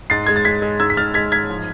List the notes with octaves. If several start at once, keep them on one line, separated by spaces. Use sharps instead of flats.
G#2 A6 C7
G#3 G#6
A6
G#3 G#6 B6
G#3
G#2 E6 G#6
B6
G#2 F6 A6
G#3 G#6 B6
G#2 G#6 B6
F3